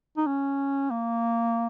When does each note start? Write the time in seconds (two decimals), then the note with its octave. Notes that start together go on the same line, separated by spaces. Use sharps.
0.17 D#4
0.27 C#4
0.90 A#3